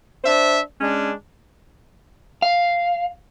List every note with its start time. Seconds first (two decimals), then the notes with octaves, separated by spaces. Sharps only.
0.24 D4 C5 E5
0.80 G#3 C#4 D4
2.42 F5